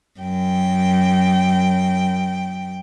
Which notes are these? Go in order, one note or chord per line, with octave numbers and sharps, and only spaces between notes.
F#2 G5